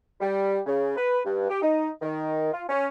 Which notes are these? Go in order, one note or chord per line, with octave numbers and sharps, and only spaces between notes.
G3
C#3
B4
G2
G4
D#4
D#3
F4
C#4